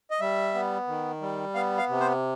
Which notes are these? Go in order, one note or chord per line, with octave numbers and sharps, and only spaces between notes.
D#5
G3 E5
B3
D#3
G3
B3 F5
F5
C3
C5